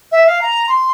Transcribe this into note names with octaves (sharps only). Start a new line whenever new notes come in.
E5
F5
A#5
C6